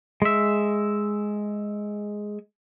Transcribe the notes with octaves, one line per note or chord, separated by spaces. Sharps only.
G#3 E5